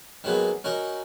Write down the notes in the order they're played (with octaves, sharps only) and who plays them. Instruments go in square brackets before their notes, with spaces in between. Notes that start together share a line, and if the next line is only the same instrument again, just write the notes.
[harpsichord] D#3 F#3 G#3 A#3 B3
C#4 D#4 F#4 A#4